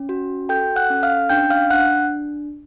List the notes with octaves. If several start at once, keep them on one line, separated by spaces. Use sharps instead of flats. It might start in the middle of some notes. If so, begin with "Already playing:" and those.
Already playing: C#4
F#4
A4 G5 G6
F#5 F#6
C#4
F5 F6
D4 G5 G6
F5 F6
D4 F#5 F#6